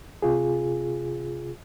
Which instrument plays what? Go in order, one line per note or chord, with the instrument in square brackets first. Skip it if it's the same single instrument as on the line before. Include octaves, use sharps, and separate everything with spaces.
[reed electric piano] C3 F4 G#4